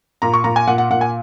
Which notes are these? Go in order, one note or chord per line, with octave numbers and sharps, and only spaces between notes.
A#2 A#5
C#6
A#2 A#5
G#5
A#2 F#5
F#5
A#2 F#5
G#5